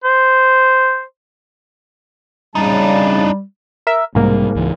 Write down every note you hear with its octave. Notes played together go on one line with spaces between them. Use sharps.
C5
C#3 G3 D4 D#4 A5
A#4 E5
B1 G#2 C3 G3 A#3
C#2 E3